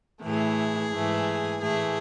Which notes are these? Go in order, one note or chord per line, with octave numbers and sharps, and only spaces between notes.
A2 E3 A3 G#4
G#2 E3 A3
A2 E3 A3 G#4